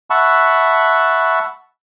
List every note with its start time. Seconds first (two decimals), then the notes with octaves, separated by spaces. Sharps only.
0.10 E5 F#5 A5 B5 C#6